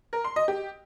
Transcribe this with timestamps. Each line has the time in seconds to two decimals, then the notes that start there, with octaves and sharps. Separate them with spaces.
0.13 A#4
0.24 C6
0.36 D#5
0.48 G4